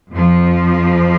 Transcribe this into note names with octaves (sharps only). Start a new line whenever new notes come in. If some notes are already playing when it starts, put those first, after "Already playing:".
F2 F3